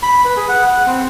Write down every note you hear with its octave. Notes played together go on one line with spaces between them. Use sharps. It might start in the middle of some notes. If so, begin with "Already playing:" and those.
B5
B4
G#4
F#5
F#5
C4